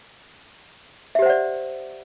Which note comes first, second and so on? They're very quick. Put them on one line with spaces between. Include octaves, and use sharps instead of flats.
E5 G4 C5 F#5 D5